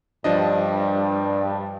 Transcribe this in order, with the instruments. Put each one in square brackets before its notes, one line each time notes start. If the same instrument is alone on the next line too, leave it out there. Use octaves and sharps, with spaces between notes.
[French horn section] G2 [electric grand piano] F3 D4 D#5